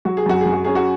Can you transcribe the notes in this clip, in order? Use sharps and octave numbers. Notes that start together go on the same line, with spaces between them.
F#3 F#4
G#4
F#2 F#4
F#2 G#4
F#4
C#4 G#4
F#4